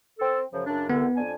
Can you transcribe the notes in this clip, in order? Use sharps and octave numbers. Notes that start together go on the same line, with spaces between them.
C4 A4
F#2 C#3 F3
F#2 C#3 D4
C2 D3 B3
F2 D4 G#5